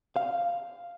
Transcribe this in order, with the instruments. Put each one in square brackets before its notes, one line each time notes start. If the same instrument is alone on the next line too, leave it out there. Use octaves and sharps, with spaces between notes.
[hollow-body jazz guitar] F5